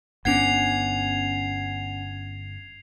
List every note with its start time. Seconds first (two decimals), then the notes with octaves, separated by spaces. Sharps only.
0.25 G1 B3 C#4 D4 F#5 G#6 C7 F7